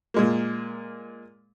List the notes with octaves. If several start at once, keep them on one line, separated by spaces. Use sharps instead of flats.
A#2 G#3 A#3